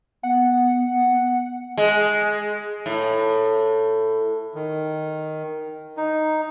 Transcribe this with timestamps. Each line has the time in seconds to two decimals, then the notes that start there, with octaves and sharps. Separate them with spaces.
0.23 B3 F#5
1.77 G#3
2.86 A2
4.55 D#3
5.97 D#4